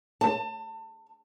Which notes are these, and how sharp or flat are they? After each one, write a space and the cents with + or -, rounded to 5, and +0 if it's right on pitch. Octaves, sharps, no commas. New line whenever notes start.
A5 +30